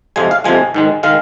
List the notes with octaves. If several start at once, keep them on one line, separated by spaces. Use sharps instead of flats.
F2 C3 F3 G#3 G#5
F5
F2 C3 F3 G#3 G#5
G#2 D#3 G#3
D#3 G#3 F5